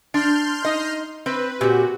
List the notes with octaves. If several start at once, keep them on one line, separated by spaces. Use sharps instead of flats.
D4 C6 F6 G6
D#4 D#5
C4 B4
A#2 C4 F#4 G4